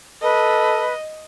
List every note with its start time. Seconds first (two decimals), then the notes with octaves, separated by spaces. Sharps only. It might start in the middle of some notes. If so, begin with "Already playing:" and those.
0.22 A4 B4 D#5